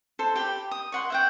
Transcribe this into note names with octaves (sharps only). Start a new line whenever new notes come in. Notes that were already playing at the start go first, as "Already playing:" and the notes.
A4 C5
G4 G5 A5 B5
D#6
C#5 F#5 C6
E5 F#5 G5